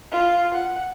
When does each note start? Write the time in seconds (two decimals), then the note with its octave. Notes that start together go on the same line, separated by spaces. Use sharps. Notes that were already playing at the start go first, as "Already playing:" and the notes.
0.12 F4
0.55 F#5